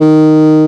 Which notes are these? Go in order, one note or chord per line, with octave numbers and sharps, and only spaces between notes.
D#3